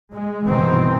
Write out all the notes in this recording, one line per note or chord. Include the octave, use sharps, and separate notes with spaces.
G#3
G1 B2 D#3 E3 C4